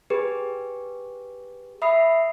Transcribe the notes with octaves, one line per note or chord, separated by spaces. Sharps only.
G4 G#4 B4
E5 B5 D#6 C7